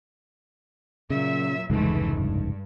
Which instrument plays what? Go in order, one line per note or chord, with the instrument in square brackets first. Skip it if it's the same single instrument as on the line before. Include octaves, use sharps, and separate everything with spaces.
[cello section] A#2 F#3 E5 [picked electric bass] C#3
[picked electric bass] F1 C#2 G#2 [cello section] E3 G#3 A3
[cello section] G2